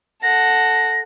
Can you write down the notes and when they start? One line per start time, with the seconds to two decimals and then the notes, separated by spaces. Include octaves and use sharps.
0.23 A4 F#5 A#6